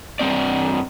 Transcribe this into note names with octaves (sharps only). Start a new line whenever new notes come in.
G2 C4 D5